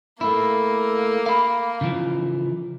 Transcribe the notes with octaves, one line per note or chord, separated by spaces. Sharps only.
A3 A#3 E4
F5 B5
C#3 E3 F3